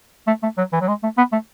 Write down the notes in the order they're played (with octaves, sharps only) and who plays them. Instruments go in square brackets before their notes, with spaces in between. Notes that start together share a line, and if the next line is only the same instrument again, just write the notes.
[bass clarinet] A3
A3
F#3
E3
F#3
G#3
A3
B3
A3